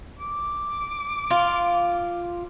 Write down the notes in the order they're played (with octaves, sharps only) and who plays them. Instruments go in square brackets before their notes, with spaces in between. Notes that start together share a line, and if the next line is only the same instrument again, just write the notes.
[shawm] D6
[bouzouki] F4